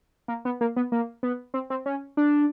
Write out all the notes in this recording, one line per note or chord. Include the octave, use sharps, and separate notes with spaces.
A#3
B3
A#3
B3
A#3
B3
C4
C4
C#4
D4